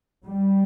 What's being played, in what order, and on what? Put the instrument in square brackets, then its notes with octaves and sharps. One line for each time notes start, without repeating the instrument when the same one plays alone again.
[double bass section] G3